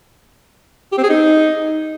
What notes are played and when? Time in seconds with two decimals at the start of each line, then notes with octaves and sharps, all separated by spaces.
0.92 G4
0.98 C4
1.04 G#4
1.09 D#4